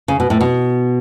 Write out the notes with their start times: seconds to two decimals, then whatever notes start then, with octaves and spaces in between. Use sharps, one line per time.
0.08 C#3
0.20 B2
0.30 A2
0.41 B2